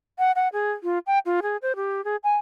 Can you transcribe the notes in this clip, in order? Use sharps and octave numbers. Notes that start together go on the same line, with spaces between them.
F#5
F#5
G#4
F4
G5
F4
G#4
C5
G4
G#4
G#5